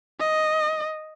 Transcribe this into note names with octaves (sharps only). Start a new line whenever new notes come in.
D#5